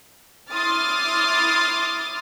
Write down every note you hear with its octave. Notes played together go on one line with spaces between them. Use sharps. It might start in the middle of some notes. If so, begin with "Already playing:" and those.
E4 C6 D6 D#6 F6 A6